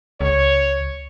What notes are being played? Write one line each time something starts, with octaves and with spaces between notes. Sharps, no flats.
C#2 C#5